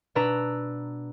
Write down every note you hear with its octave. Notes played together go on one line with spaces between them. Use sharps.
B2 D4 B4 A#5 E6